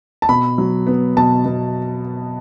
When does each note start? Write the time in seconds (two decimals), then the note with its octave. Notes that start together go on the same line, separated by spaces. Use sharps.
0.22 A5
0.29 B2 B5
0.58 F#3
0.87 B3
1.17 B2 A5
1.46 B2